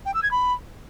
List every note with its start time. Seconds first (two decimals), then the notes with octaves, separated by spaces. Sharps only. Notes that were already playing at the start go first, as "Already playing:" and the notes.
0.05 G5
0.14 E6
0.23 G#6
0.31 B5